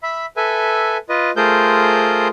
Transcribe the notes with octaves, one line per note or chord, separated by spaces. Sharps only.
E5 B5
A4 B4 E5 G#5
F4 B4 D#5
A3 F4 G#4 A#4 C5 G6